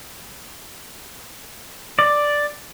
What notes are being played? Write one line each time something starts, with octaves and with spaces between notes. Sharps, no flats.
D5